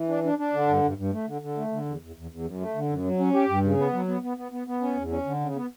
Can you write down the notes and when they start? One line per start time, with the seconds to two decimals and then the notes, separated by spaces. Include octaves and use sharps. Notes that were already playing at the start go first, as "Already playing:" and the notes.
Already playing: E3
0.09 D4
0.24 D4
0.38 D4
0.53 D3
0.68 G2
0.83 G2
0.97 G2
1.12 A3
1.27 D3
1.42 D3
1.57 A3
1.72 D3
1.86 E2
2.01 E2
2.16 E2
2.31 E2
2.45 F#2
2.60 A3
2.75 D3
2.90 F#2
3.04 F#3
3.19 C#4
3.34 G4
3.49 G2
3.64 C#3
3.78 B3
3.93 F#3
4.08 B3
4.23 B3
4.37 B3
4.52 B3
4.67 B3
4.81 C#4
4.96 E2
5.11 C#4
5.26 D3
5.41 C#3
5.56 B3